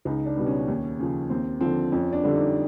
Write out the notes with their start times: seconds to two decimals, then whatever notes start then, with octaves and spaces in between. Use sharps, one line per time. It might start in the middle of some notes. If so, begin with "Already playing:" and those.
0.05 C#2 D#4
0.26 D4
0.37 B2 G3
0.47 C#4
0.68 D#2
0.99 C#3 F3
1.30 D#2 C4
1.61 D3 F3 C4
1.92 F2 C#4
2.13 D4
2.23 D3 G3
2.34 D#4